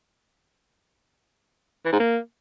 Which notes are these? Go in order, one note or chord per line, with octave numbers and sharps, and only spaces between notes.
E3
G#2
A#3